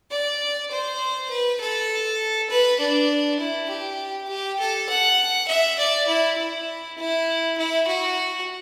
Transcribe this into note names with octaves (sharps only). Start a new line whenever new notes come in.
D5
C5
B4
A4
B4
D4
E4
G4
G4
A4
F#5
E5
D5
E4
E4
E4
E4
F#4